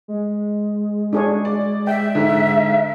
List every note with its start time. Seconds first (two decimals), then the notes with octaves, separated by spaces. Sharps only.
0.08 G#3
1.13 D4 G#4 C#5
1.45 D5
1.87 E5 G5
2.15 G#2 D3